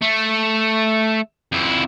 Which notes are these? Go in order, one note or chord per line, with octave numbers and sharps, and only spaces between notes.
A3
F2 E4